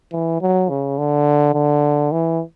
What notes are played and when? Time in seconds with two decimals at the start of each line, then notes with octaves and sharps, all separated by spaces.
0.12 E3
0.41 F#3
0.69 C#3
0.98 D3
1.54 D3
2.12 E3